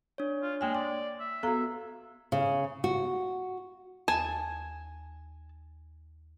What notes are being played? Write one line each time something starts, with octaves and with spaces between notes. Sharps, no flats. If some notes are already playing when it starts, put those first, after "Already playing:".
D4 C#5
F4
G#3 A#3 G5 G#5
D5 C6
E5
B3 F#4 A4 F5 A#5
C#3
F#4
D#2 G#5 A5